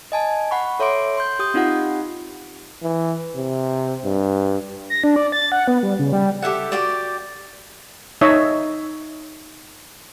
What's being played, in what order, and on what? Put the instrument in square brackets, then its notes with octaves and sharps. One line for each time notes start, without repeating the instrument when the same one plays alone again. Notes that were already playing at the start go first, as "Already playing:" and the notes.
[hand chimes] D#5 G#5 A5
F#5 B5 C#6
A4 C#5 E5 C6 D6 D7
C6 G6
G4 D#6 G6
C4 D#4 F4 G4 F#5
[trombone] E3
C3
G2
[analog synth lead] A#6
D4
D5
A6
F#5
B3
G3
C#3
G3
[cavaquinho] G4 A4 E5 F#5
F#4 G4 D5
[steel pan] D#4 C#5 D#5 E5